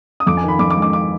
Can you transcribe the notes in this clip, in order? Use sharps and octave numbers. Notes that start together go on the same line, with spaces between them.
D#6
F2 D6
G#5
D#3 B5
F2 D6
D6
G#3
D6
D6